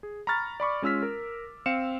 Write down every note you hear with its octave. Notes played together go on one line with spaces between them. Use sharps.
G#4
A#5 B5 C#6 F6 A6
D5 B5 C#6 D6
G#3 C#4 F4 E6 F6 B6
A#4
C4 F5 C#7 E7